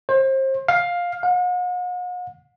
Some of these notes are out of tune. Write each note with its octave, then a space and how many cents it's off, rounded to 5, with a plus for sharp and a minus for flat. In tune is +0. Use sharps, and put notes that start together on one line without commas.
C5 +30
F5 +10
F#5 -45